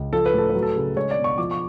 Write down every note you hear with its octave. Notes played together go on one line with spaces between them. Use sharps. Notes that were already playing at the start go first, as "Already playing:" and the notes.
Already playing: C#2
F3 A4
B4
A2 A4
F#3 B4
A4
C#3
G#3 C#5
D5
B2
C#6
F3 D6
C#6